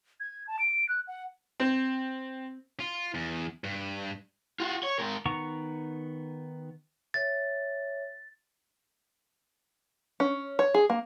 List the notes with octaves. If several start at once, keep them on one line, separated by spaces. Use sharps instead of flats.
G#6
A5
D7
F#6
F#5
C4
F4
E2
G2
F4 F#4
C#5
G#2 A#4
D#3 B3 F#5 A#5 C#6
C#5 E5 A6
C#4
C#5
G#4
A#3